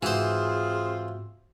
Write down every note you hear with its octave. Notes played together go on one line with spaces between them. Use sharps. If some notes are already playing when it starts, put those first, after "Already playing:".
G#2 E3 C4 F4 F#4 G#4 C5